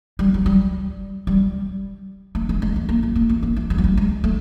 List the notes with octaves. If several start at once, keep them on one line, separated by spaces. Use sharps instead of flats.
G3
F#3
G3
G3
A3
G#3
G#3
A3
A#3
A3
A#3
A3
A#3
A3
G#3
F#3
G3
G#3
A3